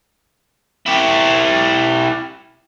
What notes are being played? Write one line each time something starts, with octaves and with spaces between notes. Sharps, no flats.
E4 G4